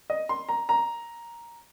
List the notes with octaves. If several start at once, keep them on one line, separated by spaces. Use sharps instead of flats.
D#5
C6
A#5
A#5